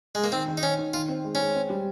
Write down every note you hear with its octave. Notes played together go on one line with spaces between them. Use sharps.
G#3
A#3
D#3 C4
D#3
D#4
D#3 C#4
D#3
D#3 F4
C4
G#3
G#3 C#4
C4
G3